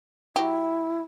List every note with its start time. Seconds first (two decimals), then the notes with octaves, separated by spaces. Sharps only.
0.36 F#3 E4 G4